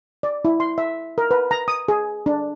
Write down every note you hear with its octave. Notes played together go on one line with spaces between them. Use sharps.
D5
E4
C6
E5
A#4
B4
A#5
D#6
G#4
D4